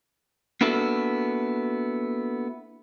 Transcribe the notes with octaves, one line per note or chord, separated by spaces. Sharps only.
A#3 B3 D4 E4 F#4 A4